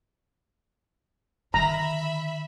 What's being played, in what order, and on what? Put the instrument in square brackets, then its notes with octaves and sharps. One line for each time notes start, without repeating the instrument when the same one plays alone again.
[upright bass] D3 D#3 [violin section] E5 B5 [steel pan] A#5